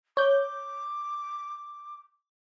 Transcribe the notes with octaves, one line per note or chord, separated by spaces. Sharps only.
C#5 D6 G6